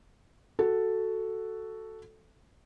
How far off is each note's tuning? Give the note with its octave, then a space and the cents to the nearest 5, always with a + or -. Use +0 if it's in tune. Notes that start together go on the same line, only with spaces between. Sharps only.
F#4 +5 A4 +0